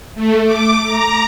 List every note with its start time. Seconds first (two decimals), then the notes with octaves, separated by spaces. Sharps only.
0.15 A3
0.44 D6
0.84 A#5